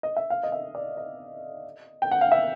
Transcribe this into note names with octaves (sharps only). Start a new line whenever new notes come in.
D#5
E5
F5
D#5
E5
D5
D#5
G5
F#5
F5
E5